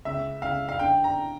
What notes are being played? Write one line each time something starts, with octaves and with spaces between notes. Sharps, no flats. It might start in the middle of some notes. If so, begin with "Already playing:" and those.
C#2 E5
C#2 F5
F5
D3 G5
A#5